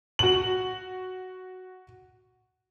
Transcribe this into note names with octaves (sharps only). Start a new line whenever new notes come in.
F#4 F#7